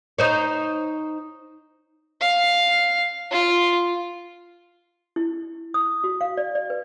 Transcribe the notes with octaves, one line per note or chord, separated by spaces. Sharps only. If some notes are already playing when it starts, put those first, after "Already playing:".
D#4 C5 C#5
F5
F4
E4
D#6
F#4
F5
D5
D5
B4